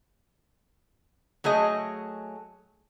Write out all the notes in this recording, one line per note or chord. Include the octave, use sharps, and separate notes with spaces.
F#3 A3 G#4 D#5